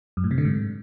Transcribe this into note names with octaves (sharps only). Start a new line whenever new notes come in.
F#2
A2
C3
D3
G#2